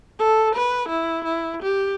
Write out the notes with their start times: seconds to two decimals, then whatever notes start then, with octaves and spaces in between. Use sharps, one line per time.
0.19 A4
0.55 B4
0.88 E4
1.24 E4
1.63 G4